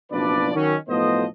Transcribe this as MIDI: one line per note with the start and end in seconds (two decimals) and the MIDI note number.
0.12 0.51 30
0.12 0.51 47
0.12 0.51 53
0.12 0.51 62
0.12 0.51 71
0.12 0.51 74
0.55 0.75 51
0.55 0.75 54
0.55 0.75 61
0.89 1.25 35
0.89 1.25 45
0.89 1.25 53
0.89 1.25 59
0.89 1.25 72
0.89 1.25 75